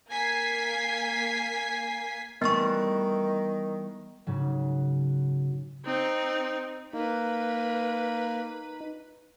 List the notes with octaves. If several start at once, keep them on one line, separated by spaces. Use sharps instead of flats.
A#3 G#5 G#6 B6 C7
D#3 E3 G3 A3 B3 C#6
G#2 C#3 F#3
C4 D#4
A#3 D#4 B4 B5